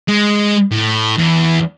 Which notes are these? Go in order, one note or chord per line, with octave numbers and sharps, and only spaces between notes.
G#3
A2
E2